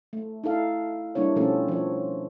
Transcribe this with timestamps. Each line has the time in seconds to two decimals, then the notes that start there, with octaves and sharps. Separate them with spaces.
0.13 A3
0.44 D#4 E4 A4 F5
1.15 G3 A#3 D4 E4 C#5
1.36 B2 F3 A3 C4 C#4 A4
1.68 F3 C#5